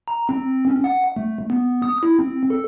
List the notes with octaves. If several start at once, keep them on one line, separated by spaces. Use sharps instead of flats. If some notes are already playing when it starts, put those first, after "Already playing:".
A#5
C4
C#4
F#5
A3
B3
D#6
E4
C4
A4